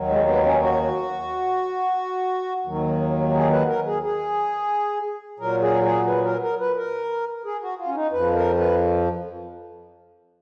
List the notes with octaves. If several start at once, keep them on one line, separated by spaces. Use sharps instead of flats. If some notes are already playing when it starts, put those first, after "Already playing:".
Already playing: D#2 D#3 F#3
G#3
B3
C#4
F#4
D#2 D#3 F#3
G#4
B4
A#4
G#4
G#4
A#2 F#3 A#4
G#4
G#4
B4
A#4
A#4
B4
A#4
G#4
F#4
F4
C#4
D#4
F2 F3 B4
A#4
B4